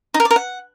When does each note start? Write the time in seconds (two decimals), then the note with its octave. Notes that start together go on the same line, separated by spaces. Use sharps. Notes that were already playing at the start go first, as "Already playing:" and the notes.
0.14 D#4
0.20 A#4
0.25 D5
0.31 A#4
0.36 F#5